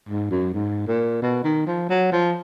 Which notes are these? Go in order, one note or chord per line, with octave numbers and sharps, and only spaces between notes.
G#2
F#2
G#2
A#2
B2
D#3
F3
F#3
F3